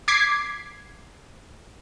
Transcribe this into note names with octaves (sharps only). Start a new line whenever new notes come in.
D6 G#6 B6 C7